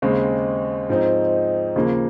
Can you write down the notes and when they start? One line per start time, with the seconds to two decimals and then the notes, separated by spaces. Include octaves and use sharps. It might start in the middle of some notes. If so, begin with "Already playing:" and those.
0.02 D#2 C#3 G#3 C4
0.90 G#2 F3 C4 D#4
1.76 D#2 C#3 F3 A#3